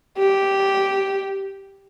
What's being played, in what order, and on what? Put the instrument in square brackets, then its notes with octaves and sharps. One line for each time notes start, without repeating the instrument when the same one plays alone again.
[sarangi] G4